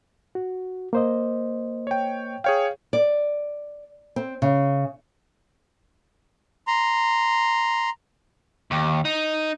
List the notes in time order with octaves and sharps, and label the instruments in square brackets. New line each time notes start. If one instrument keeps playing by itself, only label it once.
[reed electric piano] F#4
A#3 C5 D#5
[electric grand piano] C#5 G5
[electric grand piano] G#4 C#5 G5 [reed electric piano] F5
[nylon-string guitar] D5
C4
C#3
[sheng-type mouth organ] A#5 C6
[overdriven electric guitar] D#2
D#4